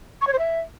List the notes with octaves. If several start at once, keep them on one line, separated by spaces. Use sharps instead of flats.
C#6
C#5
C5
E5